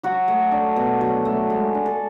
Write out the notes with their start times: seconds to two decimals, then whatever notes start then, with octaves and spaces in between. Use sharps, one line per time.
0.03 F#3 F#4
0.28 A3
0.52 D4
0.76 B2
1.01 F#3
1.25 A3
1.50 G#3
1.74 D4
1.86 A4